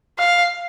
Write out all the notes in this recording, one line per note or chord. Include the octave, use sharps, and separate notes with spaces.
F5